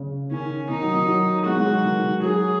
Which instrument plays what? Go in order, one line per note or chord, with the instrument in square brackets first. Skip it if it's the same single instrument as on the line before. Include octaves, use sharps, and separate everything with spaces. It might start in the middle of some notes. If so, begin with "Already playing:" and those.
Already playing: [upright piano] C#3
[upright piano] D#3 [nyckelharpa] C#4
[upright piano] D#3 [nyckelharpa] D#4
[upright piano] F#3
D#3
F#3
[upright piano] G#3 [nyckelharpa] F#4
[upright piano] G#3
F#3
D#3
D#3
[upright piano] F#3 [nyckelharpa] G#4